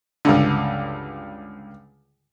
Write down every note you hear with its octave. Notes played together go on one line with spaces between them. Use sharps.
C#2 G2 D3